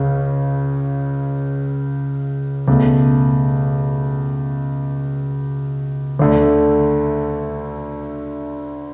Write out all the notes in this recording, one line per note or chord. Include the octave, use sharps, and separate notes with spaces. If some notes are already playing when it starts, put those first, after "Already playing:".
Already playing: C#2 C#3 C#4
C#2 B2 A3
D2 D3 A3